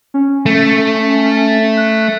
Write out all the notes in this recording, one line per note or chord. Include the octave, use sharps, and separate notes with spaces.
C#4
A3
F#6